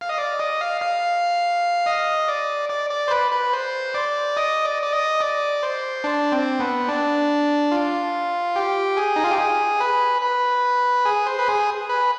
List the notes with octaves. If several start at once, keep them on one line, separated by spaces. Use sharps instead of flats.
F5
D#5
D5
D#5
F5
F5
D#5
D5
D5
D5
C5
B4
B4
C5
D5
D#5
D5
D5
D#5
D5
C5
D4
C4
B3
D4
F4
G4
G#4
D#4
F4
G4
G#4
B4
B4
G#4
C5
B4
G#4
B4